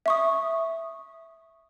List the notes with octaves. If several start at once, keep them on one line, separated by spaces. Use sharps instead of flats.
E5 C#6 D#6